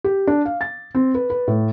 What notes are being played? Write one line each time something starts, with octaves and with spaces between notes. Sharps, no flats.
G4
D4
F5
A6
C4
B4
B4
A2